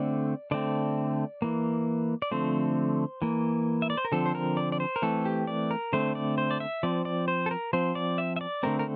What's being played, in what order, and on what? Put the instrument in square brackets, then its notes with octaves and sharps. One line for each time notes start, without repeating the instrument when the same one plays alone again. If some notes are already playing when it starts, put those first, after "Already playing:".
Already playing: [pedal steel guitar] D3 A3 C4 D5
D3 A3 C4 D5
E3 A#3
D5
D3 F3 A3 C4 C5
E3 A#3
E5
D5
C5
A#4
D3 F3 C4 A4
C5
A#4
D5
D5
C5
A#4
E3 A3 C4 A4
G4
D5
A#4
D3 A3 C4 C5
D5
C5
D5
E5
F3 C4 D5
D5
C5
A4
A#4
F3 C4 C5
D5
E5
E5
D5
D3 A3 C4 A#4
A#4